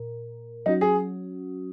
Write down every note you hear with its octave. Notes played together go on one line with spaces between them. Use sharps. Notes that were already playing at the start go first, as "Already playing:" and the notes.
Already playing: A#2 A#4
F#3 C#4 D#4 F#4
G#4